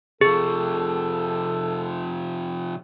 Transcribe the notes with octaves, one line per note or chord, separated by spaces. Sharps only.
C3 F3 G#4 A4